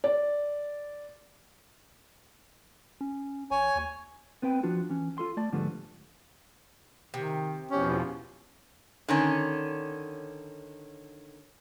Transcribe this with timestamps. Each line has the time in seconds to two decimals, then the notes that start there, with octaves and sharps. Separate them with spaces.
0.04 D5
3.01 C#4
3.51 A1 C#5 G#5
3.76 D#2
4.42 B3 C4 B4 G5
4.63 F3 D4 F4 F#4
4.90 E3 C#4
5.18 F4 A4 C6
5.37 A3 D5 A5
5.52 G#2 D3 F3 G3 A3 B3
7.14 C3 D#3
7.71 E2 B2 F3 C#4 G4
9.08 D3 D#3 C#4